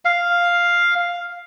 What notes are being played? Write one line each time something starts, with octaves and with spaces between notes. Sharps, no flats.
F5